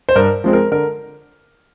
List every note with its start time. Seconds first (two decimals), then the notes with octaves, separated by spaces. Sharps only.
0.09 C5
0.16 G2 A#4
0.44 F3 G#3 C4
0.53 A#4
0.72 D3 A#4